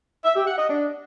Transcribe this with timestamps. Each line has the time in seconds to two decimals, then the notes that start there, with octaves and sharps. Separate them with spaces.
0.24 E5
0.35 G4
0.46 F#5
0.57 D#5
0.68 D4